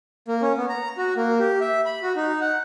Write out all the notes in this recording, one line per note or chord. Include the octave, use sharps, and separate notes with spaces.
A#3
C#4
B3
A#5
F#4
A#3
G4
E5
B5
F#4
D#4
F#5